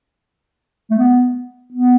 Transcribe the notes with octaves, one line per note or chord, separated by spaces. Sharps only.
A3
B3
B3